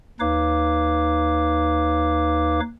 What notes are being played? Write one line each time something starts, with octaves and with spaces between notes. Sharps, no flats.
D#2 D#4 B4 C#5 F5 D6